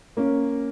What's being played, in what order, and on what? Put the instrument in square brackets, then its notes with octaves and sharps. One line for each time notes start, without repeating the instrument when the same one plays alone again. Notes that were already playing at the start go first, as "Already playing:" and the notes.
[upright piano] A#3 C#4